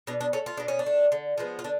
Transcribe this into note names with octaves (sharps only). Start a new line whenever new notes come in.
B2 D4
D4
A3 C#4
F4
B2 D4
C#4
D4
A3
D3
F3 G#3 B3
F4
D3 D4